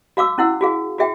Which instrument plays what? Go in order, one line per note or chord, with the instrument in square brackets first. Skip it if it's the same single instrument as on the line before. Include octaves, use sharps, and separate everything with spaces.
[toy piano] F#4 F5 D6 E6
C#4 E4 F#5 E6
F#4 G#4 F5
F#4 G#4 E5 G5